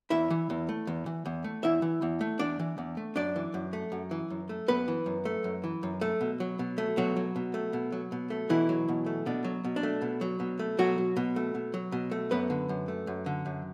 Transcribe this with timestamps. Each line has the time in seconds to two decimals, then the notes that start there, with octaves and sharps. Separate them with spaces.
0.10 E2 E4 E5
0.30 E3
0.50 E2
0.69 A3
0.87 E2
1.06 E3
1.26 E2
1.44 A3
1.63 E2 E4 E5
1.82 E3
2.02 E2
2.21 A3
2.39 E2 D4 D5
2.60 E3
2.78 E2
2.97 A3
3.16 F#2 D4 D5
3.36 E3
3.54 F#2
3.73 A3
3.92 F#2
4.11 E3
4.30 F#2
4.49 A3
4.68 F#2 B3 B4
4.88 E3
5.06 F#2
5.25 A3
5.44 F#2
5.64 E3
5.83 F#2
6.01 A3
6.21 B2
6.40 F#3
6.59 B2
6.78 A3
6.97 B2 F#3 F#4
7.16 F#3
7.36 B2
7.54 A3
7.73 B2
7.92 F#3
8.12 B2
8.30 A3
8.49 B2 E3 E4
8.69 F#3
8.88 B2
9.06 A3
9.26 B2 D4
9.44 F#3
9.64 B2
9.76 D4
9.83 A3
10.02 B2
10.21 F#3
10.40 B2
10.59 A3
10.78 B2 F#3 F#4
10.98 F#3
11.16 B2
11.36 A3
11.55 B2
11.74 F#3
11.92 B2
12.11 A3
12.31 F#2 B3 B4
12.50 D3
12.69 F#2
12.88 A3
13.07 F#2
13.26 D3
13.46 F#2